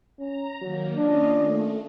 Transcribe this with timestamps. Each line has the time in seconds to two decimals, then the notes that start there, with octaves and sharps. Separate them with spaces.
0.19 C#4 A#5
0.61 D#3 F#3 A#3
0.96 C#4 D4 F4 D#5
1.33 A3